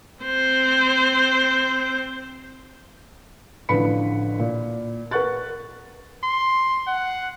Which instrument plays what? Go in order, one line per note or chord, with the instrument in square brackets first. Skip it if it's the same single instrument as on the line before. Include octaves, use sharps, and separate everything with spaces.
[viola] C4 C5
[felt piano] A1 D3 F3 B4 B5 C#7
A#2
A#4 B4 F#5 C#6 F#6 A6
[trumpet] C6
F#5